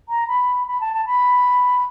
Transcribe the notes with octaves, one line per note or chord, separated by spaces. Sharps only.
A#5
B5
B5
A5
A5
B5